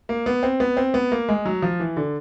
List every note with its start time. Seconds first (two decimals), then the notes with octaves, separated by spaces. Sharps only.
0.09 A#3
0.26 B3
0.43 C4
0.60 B3
0.77 C4
0.94 B3
1.12 A#3
1.29 G#3
1.46 F#3
1.62 F3
1.80 E3
1.97 D3